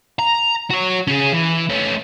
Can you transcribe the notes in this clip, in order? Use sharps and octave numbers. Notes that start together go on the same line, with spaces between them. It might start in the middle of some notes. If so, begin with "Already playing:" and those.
A#5
F#4 C#5
C#4 G#4
E3
A3 C#4